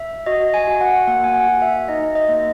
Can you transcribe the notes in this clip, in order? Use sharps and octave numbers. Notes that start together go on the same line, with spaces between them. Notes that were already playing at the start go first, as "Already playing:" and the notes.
Already playing: E5
F#4 D#5
G#5
F#4
F#5
A#3 F#5
G#5
F#5
F#4
E5
D#4 D#5
D#5
A#3